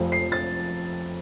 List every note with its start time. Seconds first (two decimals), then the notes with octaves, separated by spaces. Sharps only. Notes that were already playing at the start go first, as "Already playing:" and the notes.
Already playing: F1 F2 F3
0.12 C7
0.32 A6